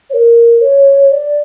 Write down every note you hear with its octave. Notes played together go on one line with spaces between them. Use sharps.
C#5
A#4
C#5
D5